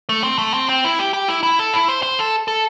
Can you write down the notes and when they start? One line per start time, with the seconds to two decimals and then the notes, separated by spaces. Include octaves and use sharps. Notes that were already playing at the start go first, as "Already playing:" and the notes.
0.09 A3
0.24 C4
0.38 A3
0.54 C4
0.69 C4
0.84 E4
0.99 G4
1.13 G4
1.28 E4
1.43 E4
1.59 A4
1.74 E4
1.88 C5
2.03 C5
2.19 A4
2.48 A4